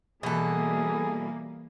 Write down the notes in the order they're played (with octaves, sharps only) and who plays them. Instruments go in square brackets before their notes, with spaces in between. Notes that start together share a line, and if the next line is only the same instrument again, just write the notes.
[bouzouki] B2 A4 [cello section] E3 G3 A#3 [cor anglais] G#4